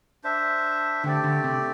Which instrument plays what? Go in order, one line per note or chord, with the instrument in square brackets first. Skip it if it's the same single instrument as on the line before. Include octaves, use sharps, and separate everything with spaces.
[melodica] D4 C5 E5
[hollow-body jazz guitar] D3 [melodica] A3 C4 G4 D5
[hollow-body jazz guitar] D3
C3